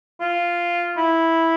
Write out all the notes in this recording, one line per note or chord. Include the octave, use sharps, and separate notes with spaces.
F4
E4